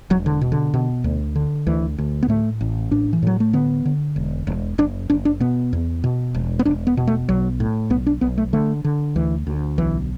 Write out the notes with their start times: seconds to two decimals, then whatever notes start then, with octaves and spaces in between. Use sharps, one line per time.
0.10 E1 F#3
0.26 D3
0.41 B2
0.52 D3
0.74 B2
1.04 D2
1.36 D3
1.67 D2 E3
1.98 D2
2.23 B3
2.28 A2 A3
2.61 A1
2.91 A2 D4
3.13 E3
3.23 A2 F#3
3.40 A3
3.53 D3 B3
3.85 D3
4.16 E1
4.47 E1
4.78 F#1 D4
5.10 F#1 D4
5.25 D4
5.40 B2 B3
5.73 E2
6.04 B2
6.35 E1
6.59 B3
6.65 E1 D4
6.87 B3
6.97 B2
7.07 A3
7.29 B1 F#3
7.60 A2
7.90 B1 B3
8.06 D4
8.21 B1 B3
8.38 A3
8.53 D3 A3
8.84 D3
9.16 D2 E3
9.47 D2
9.78 B1 E3